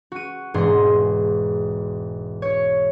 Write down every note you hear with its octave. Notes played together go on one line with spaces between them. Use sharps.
F#4 D#7
E1 G#2 G#4 C6
C#5